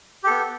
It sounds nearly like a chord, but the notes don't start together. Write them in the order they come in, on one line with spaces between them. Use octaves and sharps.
G4 A4 B3